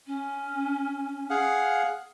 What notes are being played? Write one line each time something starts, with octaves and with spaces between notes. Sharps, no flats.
C#4
G#4 F5 F#5